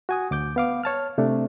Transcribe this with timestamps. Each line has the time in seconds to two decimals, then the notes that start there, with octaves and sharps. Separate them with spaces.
0.09 F#4 G#5 D#6
0.31 D2 D6 G6
0.56 B3 F5 D6
0.84 C#5 A5 F6
1.18 C3 A3 D4